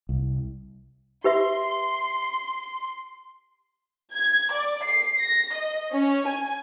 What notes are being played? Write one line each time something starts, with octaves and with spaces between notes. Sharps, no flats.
C2
G4 B4 E5 C6
G#6
D5
C7
A#6
D#5
C#4
G#5